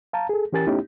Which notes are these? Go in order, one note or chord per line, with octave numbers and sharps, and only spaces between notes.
F5 A5 A#5
G#4 A4
E3 C#4 G4 A#4 G#5 A6
A3 B3 C#4 D#4 E4 G4